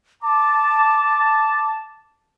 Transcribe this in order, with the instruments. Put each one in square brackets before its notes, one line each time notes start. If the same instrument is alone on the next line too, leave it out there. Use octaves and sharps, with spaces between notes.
[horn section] A5 [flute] D6